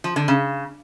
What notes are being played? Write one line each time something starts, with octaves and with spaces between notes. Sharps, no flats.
F3
D3
C#3